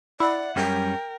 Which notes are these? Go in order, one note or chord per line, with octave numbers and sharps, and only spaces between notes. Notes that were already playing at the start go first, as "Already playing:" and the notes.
E4 D5 F#5
F#2 G3 C#4 A#4 G5